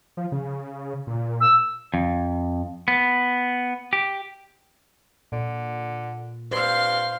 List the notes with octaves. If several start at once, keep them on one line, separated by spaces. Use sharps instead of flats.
F3
C#3
A#2
E6
F2
B3
G4
A#2 D3
G2 C5 F5 C6